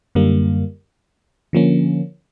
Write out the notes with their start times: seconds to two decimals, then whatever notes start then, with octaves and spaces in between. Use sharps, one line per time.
0.15 F#2 D3 G3 A#3
1.53 D3 F3 A#3 C#4